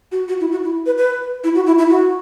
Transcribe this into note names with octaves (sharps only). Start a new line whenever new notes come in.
F#4
F#4
E4
F#4
E4
B4
B4
E4
F#4
E4
E4
F#4